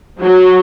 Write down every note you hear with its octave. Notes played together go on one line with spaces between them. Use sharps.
F#3